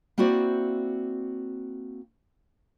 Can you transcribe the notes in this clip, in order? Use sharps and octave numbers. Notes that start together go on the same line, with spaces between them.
A#3 C4 E4 F#4 C5 D5